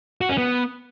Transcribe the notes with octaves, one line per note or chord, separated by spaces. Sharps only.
F#4
C#4
B3